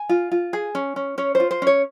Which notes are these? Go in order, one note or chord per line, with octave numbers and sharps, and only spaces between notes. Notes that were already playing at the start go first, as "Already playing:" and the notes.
Already playing: G#5
F4
F4
G#4
C#4
C#4
C#4 C#5
C5
F4
C5
C#4 C#5